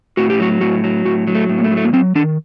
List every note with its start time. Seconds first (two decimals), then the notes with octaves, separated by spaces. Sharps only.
0.17 A2 F#4
0.30 G4
0.40 F#3 F#4
0.61 A2 F#4
0.84 F#3
1.05 A2 F#4
1.27 F#3
1.35 A3
1.49 A2
1.58 A#3
1.64 A3
1.71 F#3
1.77 A3
1.84 A#3
1.93 F#3 C4
2.15 D#3 D4